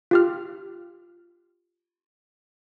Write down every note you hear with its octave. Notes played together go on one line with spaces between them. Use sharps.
F4 G4 F6